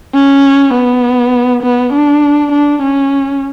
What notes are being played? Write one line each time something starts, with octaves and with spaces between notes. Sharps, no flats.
C#4
B3
B3
D4
D4
C#4